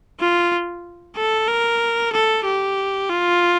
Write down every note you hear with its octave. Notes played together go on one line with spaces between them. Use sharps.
F4
A4
A#4
A4
G4
F4